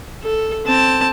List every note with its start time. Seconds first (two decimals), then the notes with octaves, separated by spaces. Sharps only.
0.23 A4
0.66 C4 A5